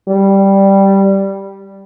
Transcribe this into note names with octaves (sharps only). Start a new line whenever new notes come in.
G3